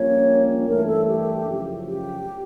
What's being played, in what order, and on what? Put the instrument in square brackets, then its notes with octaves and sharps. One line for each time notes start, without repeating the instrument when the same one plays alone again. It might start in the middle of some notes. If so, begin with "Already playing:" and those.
Already playing: [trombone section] A#1 A#2 G3 A#3 C#4 [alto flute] C#5
[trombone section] G2 E3 A3 [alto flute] A#4
[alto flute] A4
G4
[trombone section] F#2 C#3 F3
[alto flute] G4